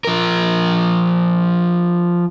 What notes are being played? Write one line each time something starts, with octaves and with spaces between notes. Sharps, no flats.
F3 A#4